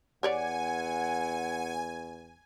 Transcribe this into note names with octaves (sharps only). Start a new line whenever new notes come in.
E2 G4 C#5 D5 F#5 G#5